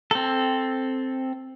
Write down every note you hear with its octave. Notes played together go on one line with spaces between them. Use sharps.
C4 A4